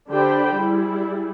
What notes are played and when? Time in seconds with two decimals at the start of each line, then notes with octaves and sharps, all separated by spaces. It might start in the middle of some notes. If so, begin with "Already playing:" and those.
0.11 D3 D4 G4 C5 G5 B5
0.56 G3 E4 G#4